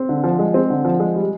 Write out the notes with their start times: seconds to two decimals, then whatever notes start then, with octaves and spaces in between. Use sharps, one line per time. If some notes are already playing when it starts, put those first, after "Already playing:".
Already playing: C4
0.09 D3
0.24 F3
0.39 G#3
0.54 C4
0.70 D3
0.85 F3
1.00 G#3
1.16 G3